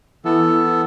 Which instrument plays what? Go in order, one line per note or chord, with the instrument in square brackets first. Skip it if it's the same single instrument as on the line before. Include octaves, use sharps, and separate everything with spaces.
[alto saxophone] E3 [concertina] B3 A4